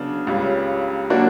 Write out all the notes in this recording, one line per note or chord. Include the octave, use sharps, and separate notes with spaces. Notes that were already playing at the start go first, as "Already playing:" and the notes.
Already playing: C#3 F#3 B3 D4
C#2 C#3 G3
F#3 A#3 D4 F#4